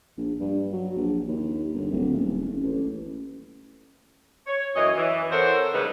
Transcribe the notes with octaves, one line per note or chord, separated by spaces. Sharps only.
A#1
G2
F#3
A#1
D#2
G1
D1
D#1
F#1
A1
C#5
F#2 E3 C#4 D#5
E3
C4 A4 A#4 C5 C#5 F#5
C#3 G3 G#3 D#4 B4